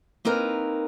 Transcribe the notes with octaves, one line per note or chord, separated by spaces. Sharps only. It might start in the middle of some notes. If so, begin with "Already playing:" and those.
A#3 C4 D#4 A#4 B4